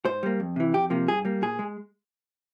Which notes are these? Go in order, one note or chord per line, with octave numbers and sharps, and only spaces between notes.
G#2 C5
G3 A#3
F2
C3 E3
F2 G4
C3 F3 A#3
G2 G#4
G3 A#3
A#2 G#4
G#3